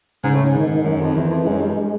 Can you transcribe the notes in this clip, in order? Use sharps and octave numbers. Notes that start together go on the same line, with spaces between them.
G#2 C#3
A2
G#2
D#3
F#2
F2
E2 E3
F2
F#2 G#3
G2